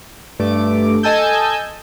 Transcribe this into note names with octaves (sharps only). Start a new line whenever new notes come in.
G2 A3 D6
A4 D#5 G#5 A5 E6 G6